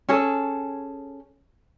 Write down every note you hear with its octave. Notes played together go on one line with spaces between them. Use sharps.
C#4 G#4 A4